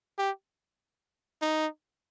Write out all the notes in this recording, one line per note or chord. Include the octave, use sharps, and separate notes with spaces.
G4
D#4